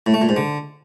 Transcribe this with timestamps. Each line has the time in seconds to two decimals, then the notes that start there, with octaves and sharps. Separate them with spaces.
0.06 A2
0.14 A3
0.21 A#2
0.29 G#2
0.36 D3